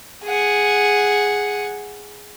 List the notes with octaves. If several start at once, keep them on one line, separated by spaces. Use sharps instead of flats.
G#4 F#5